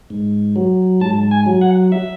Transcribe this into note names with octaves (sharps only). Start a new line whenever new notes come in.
G#2
F#3
G#2 A5
G#5
F#3
F#5
E5